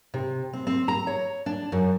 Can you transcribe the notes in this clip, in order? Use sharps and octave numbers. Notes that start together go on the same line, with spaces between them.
C3
C4
C4
A#5
C#5
D4
F#2